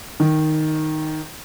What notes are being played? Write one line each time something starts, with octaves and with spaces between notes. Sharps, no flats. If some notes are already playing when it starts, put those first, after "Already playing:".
D#3